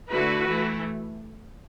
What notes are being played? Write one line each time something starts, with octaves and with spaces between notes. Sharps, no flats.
D3 A3 E4 F#4 B4
E3 A3 E4